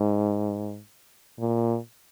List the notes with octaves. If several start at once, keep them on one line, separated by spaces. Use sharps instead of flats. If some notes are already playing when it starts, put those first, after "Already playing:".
Already playing: G#2
A#2